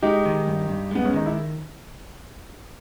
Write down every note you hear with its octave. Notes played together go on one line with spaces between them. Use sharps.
G#3 D#4 G4
D#3
G2
G2
G#3 B3
C#4
D#3 D#4
E4